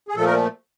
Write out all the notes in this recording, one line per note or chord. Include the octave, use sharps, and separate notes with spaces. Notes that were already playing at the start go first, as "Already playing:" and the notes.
G#4
A#2 F3 A3 A4
A#4